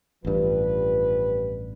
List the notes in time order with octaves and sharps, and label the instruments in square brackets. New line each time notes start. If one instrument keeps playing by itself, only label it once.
[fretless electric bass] A1 G2 [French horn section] F3 G4 B4